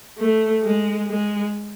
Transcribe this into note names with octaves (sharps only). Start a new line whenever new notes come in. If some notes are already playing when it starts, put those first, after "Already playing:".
A3
G#3
G#3